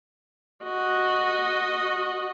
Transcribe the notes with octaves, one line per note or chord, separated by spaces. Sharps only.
F#4 D#5